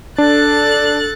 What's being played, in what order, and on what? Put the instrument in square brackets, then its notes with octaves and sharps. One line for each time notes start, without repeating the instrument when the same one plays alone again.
[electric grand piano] D4 [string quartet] A4 F#6 A6